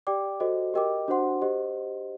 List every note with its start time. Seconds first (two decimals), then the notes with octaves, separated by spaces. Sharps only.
0.07 G4 D5 G5 D6
0.40 F#4 A4 C5 D#5
0.74 G4 A#4 D#5 G5 D6
1.08 D4 F#4 C5 F#5 C6
1.42 G4 C5 D#5